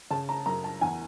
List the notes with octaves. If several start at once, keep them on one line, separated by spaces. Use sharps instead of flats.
C#3 A5
A#5
F#2 A#5
A5
E2 G#5